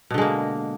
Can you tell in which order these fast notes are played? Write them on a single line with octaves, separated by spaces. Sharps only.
B2 D3 G#3 A#3